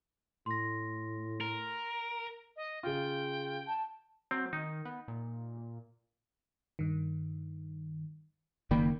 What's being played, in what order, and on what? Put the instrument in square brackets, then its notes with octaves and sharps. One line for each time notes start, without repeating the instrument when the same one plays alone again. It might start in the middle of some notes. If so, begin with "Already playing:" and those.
[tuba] A2 [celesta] C6 A#6
[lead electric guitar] A#4
[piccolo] D#5
[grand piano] C#3 F4 [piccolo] G5
[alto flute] A5
[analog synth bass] F#3 [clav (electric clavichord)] C4
[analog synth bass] D#3 [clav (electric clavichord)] D#4
[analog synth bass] B3
A#2
[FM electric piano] G2 D#3
[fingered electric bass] F#1 D#3 A#3 [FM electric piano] D5 G5 B5